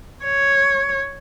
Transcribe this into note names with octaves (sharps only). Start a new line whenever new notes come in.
C#5